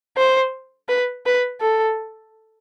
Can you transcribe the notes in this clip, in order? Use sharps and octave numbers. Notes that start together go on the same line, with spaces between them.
C5
B4
B4
A4